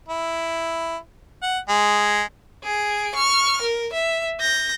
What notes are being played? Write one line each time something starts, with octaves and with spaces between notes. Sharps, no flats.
E4
F#5
G#3
G#4 D7
C#6 F6
A#4
E5
G6 A#6